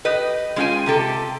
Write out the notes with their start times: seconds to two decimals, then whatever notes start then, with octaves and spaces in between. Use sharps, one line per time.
0.05 G4 B4 D#5
0.56 G#3 C#4 F4 G#4 G5 G#5
0.86 C3 G4 A4